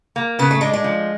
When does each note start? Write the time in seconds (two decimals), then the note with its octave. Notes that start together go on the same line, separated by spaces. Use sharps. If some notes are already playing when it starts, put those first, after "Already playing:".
0.16 A#3
0.39 C#3 B3
0.51 A3
0.61 G#3 D4
0.73 G#3
0.84 F3